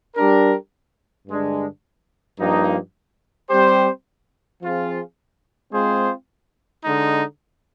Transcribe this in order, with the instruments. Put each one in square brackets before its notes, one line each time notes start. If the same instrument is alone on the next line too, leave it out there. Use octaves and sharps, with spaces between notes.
[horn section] G3 D4 G4 A#4
G2 D3 G#3 D4
G2 F3 A#3 D#4
G3 C4 G4 C5
F3 C4 F4 G#4
G#3 C4 F4 G#4 C5
D3 G#3 D#4